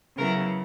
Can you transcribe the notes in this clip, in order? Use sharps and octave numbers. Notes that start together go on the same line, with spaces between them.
C#3 F#3 B3 E4 A#4